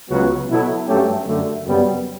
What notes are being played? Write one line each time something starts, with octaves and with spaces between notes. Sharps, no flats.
C#2 C#3 F#3 B3 F#4
B2 F#3 B3 E4 A4
G2 F#3 A3 C#4 G4
F#2 D3 A3
F#2 C#3 G3 B3